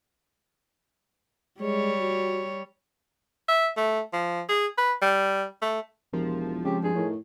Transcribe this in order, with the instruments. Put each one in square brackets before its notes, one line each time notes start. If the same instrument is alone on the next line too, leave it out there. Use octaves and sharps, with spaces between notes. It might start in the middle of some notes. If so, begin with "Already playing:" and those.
[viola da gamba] G3 C#5 [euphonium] G#3
[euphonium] F#4
[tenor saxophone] E5
A3
F3
G#4
B4
G3
A3
[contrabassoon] E1 [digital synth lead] F3 [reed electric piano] G4 A#4
[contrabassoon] C#3 [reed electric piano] G#3 C4 [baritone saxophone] G4
[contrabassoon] G2 [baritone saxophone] G#4
[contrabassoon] A2 [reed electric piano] D#4 A#4 C#5